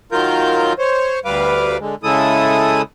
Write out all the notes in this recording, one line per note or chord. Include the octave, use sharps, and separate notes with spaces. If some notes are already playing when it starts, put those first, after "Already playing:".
D#3 F#3 F4 A#4 G6
C5 C#5
D2 G3 B4 F5 D6
D3 G#3
C#3 G#3 E4 A4 D#6